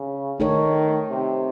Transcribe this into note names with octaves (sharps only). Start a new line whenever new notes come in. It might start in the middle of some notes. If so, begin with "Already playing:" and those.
Already playing: C#3
D#3 A3 D#4 A4 C#5
C3